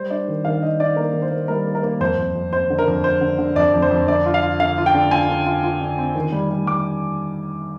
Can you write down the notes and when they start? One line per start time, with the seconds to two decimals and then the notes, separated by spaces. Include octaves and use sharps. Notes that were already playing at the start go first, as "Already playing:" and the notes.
Already playing: G3 C5
0.10 D4 D5
0.28 D#3
0.45 D#3 F5
0.62 D4 D#5
0.80 D4 D5
0.96 A#3 A#4
1.14 D#3
1.22 C5
1.31 A#3
1.48 G3 A#4
1.67 A#3
1.75 A#4
1.83 A#3
2.00 F2 C5
2.18 F2
2.35 F2
2.53 F2 C5
2.70 D3
2.79 A#4
2.88 F2
3.04 F2 C5
3.21 D3
3.39 D3
3.56 F2 D5
3.74 F2
3.82 C5
3.91 F2
4.08 D3 D5
4.26 F4
4.34 F5
4.43 F4
4.60 D3 F5
4.78 F4
4.86 G5
4.94 D3
5.11 F4 G#5
5.29 D3
5.47 F4
5.64 F4
5.81 D3
5.98 C4
6.16 D#3
6.32 G3
6.50 G3
6.67 G3 D6